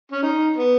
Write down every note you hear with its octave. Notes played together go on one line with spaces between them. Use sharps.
C#4
D#4
B3